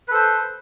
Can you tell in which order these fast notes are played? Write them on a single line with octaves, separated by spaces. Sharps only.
B4 A4 C5